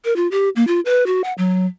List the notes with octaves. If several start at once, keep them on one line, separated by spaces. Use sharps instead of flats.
A#4
F4
G4
A#3
F4
B4
F#4
F#5
F#3